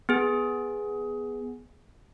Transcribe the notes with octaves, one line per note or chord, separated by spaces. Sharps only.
B3 G#4